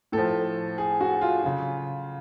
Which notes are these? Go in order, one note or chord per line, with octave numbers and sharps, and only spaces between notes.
A2 F3 A4
G#4
F#4
F4
C#3 F#3 F4